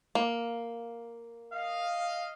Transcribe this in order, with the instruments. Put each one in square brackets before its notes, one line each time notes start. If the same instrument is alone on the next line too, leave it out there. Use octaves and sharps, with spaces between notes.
[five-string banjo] A#3
[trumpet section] D#5 F5